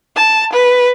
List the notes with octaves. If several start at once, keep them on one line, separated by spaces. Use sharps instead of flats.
A5
B4